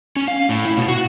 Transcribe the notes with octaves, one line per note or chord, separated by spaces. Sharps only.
C#4
F5
A2
E4
B2
F#4